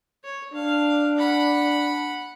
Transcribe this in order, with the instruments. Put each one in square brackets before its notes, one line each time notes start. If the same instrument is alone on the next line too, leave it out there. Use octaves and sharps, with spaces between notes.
[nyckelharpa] C#5
[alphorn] D4 [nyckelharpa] F5
[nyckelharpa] F#5 B5